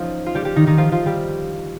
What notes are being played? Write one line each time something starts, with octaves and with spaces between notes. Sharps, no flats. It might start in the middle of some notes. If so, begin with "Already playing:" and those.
Already playing: F3 C#4 D#4 F4
F4
G3 G4
G3 G4
D#3 D#4
D#3 D#4
F3 F4
F3 F4
G3 G4